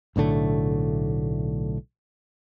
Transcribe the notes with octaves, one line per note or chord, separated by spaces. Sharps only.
B1 A2 D3 A3